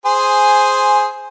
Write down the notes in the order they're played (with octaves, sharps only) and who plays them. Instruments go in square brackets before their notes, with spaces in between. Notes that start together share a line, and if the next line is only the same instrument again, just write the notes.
[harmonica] G#4 C5 G#5